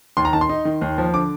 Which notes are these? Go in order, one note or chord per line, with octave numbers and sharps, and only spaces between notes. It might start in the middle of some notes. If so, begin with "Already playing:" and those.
D#2 C6
A#5
D#3 A5
C6
D#4
D#3
D#2
F3
D3 D6